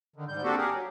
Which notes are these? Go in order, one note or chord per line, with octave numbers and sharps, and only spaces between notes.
D3 D#3
G#2 G3 G6
A#3 C4 D4 F#4 G4 A4
G4 G#4 A#4
F#3